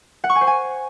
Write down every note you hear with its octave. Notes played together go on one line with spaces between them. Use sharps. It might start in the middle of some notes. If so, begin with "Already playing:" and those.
F#5
C#6
G#5
C5
G#5